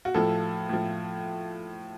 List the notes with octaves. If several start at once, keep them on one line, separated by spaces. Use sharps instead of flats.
F#4
A2 F3 A4
A2 F3